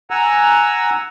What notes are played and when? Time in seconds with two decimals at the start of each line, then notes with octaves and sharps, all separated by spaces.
0.11 F#5 G#5 A#5 E6